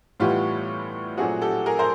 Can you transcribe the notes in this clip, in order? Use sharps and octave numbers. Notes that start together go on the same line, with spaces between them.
A2 E3 G3 B3 F4 G4
A#2 F#3 A3 C4 F#4 G#4
G4 A4
G#4 A#4
A#4 C5